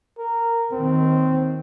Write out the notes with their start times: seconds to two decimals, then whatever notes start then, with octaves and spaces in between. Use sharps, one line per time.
0.18 A#4
0.72 D#2 D#3 C4